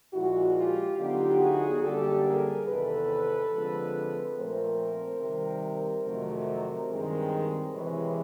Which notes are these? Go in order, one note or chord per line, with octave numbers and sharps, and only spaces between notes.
A#2 F3 G#3 E4 F#4
F4 G4
D3 F#3 B3 D#4 F4 G4
F#4 G#4
F#2 D3 G3 A#3 D4 G4 A4
G#4 A#4
E2 C3 D#3 A4 B4
D3 F3 G#3 C4
A#2 F3 A3 C4 A#4 C5
C3 D#3 G3
F2 C3 D#3 F#3 A3
G2 D#3 G#3 C4
C3 E3 G#3 B4 C#5